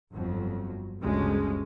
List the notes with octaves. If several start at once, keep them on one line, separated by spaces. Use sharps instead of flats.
G1 F2 F#3
G1 D2 C#3 G#3 C#4